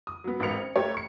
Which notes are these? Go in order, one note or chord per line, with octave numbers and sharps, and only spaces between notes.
D#6
F#3 B3
A1 G#2 A#4 B4 C#7 F7
C4
F#1 A3 G4 C#5 G5
C#6 C#7